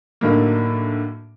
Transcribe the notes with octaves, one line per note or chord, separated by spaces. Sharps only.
A2 D3 D#3 F#3 A#3